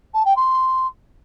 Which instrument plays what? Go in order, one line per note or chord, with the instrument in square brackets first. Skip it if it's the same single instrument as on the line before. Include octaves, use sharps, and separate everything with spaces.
[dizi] A5
G5
C6